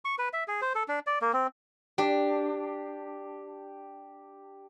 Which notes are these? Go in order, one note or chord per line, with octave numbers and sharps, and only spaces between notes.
C#6
B4
E5
G#4
C5
A4
D4
D5
A#3
C4
D4 G4